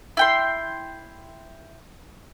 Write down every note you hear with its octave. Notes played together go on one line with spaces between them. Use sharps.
E4 G5 C6